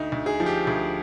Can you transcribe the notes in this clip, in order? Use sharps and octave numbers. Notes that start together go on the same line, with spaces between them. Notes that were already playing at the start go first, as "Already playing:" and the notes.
Already playing: D2 D#4
D2
G#4
F3
G4
D2 G#4